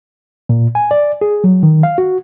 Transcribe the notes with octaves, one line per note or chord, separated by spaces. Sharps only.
A#2
G#5
D5
G#4
F#3
D#3
F5
F#4